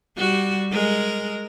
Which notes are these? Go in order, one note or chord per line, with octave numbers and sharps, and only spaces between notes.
G3 F#4
G#3 A#4